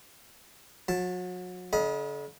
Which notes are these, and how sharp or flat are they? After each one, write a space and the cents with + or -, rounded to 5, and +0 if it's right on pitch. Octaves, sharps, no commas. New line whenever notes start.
F#3 -35 A5 +0
D3 -40 D#5 +10 B5 -35